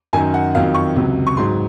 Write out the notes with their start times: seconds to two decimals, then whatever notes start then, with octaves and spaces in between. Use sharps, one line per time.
0.13 F#2 D#3 F#3 G#5
0.34 F#5
0.55 F2 D#3 F#3 F5
0.74 C#6
0.96 C#2 C3 F#3
1.27 C#6
1.37 G#2 F#3 C6